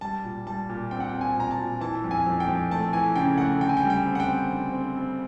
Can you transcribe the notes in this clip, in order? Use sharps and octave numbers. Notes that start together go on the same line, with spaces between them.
G3 A5
A#2
G3 A5
A#2
C4 G5
F#5
G5
C4
G#5
A#2 A#5
A5
A#2
E3 A5
F2
G#5
F2
G5
F2
A3 A5
E3 G#5
C#3 G5
A3 F#5
D3 G5
G#5
G5
G3
G5
C4
F#5
G5
C4
D3
C4
C4